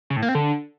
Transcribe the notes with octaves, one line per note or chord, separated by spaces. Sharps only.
C#3
A2
A#3
C4
D3